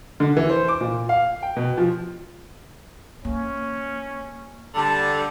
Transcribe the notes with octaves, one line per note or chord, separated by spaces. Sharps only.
D3
E3
C5
D6
A#2
F5
G5
B2
F3
A#3 C#4
D3 G3 A5